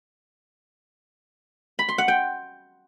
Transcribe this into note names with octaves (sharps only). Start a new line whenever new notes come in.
B5
C6
F#5
G5